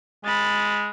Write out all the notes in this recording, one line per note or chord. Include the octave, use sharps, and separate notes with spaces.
G#3 B5 A6